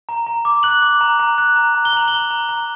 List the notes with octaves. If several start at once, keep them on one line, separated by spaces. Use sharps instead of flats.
A#5
A#5
D6
F#6 F#7
D6
A#5
A#5
F#6
A#5
A#5
G7
A#5 F#7
A#5 G7
A#5
A#5